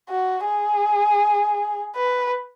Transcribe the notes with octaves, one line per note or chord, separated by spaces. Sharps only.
F#4
G#4
B4